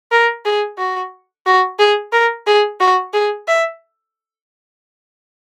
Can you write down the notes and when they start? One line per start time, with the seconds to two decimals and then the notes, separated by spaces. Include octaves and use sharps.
0.11 A#4
0.45 G#4
0.78 F#4
1.46 F#4
1.79 G#4
2.12 A#4
2.47 G#4
2.80 F#4
3.13 G#4
3.48 E5